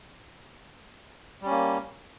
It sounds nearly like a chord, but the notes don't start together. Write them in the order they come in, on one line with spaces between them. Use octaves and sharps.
G3 C#4 A#3